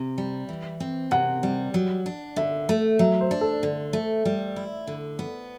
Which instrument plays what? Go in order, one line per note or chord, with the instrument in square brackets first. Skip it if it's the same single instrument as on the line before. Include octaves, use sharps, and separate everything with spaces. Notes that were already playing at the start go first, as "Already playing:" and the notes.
Already playing: [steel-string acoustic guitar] C3
G3
E3
C4
[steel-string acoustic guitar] C3 [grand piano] F#5
[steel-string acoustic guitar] G3
F#3
D4
[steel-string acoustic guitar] D3 [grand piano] E5
[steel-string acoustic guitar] A3
[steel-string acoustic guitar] F#3 [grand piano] E5
[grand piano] C5
[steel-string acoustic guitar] D4
[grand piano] A4
[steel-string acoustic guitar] D3
A3
G3
E4
D3
B3